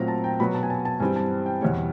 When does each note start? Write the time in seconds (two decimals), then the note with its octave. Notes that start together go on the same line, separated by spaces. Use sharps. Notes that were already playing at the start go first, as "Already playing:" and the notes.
Already playing: A#2 F#3 A3 C4 A#5
0.08 A5
0.24 G5
0.40 B2 F#3 B3 B5
0.54 A5
0.63 G#5
0.70 A5
0.85 A5
1.00 G2 E3 G3 C4 G#5
1.16 A5
1.46 G5
1.61 E2 B2 G3 C#5